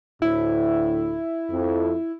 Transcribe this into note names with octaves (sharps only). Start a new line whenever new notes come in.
D2 A2 E4
F2